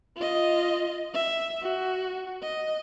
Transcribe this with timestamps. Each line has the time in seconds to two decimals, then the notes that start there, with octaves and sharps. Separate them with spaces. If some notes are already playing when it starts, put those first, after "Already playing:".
0.16 F4 D#5
1.14 E5
1.62 F#4
2.42 D#5